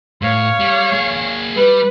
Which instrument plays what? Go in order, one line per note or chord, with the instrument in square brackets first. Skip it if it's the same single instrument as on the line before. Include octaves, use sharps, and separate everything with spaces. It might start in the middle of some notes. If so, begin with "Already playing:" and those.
[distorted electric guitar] A2 [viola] C#5 F5
[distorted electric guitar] G3
A#3 G#4
[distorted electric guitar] G3 [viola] B4